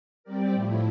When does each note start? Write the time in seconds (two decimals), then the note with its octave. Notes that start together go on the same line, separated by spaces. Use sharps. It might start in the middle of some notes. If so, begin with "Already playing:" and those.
0.24 G3 C4 G4 A#4 D5
0.52 A2 F3 A3 E4